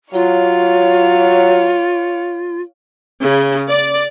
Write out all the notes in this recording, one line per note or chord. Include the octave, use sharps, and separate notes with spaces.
F#3 F4 C#5 F5
C#3
D5